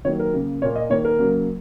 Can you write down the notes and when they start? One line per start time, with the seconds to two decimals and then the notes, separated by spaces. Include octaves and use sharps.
0.05 D#3 F#3 A#3 C#5
0.19 A#4
0.34 C#3 A#3
0.62 A#2 A#3 C#5
0.76 D#5
0.90 D#3 A#3 C#5
1.05 A#4
1.19 C#3 F#3 A#3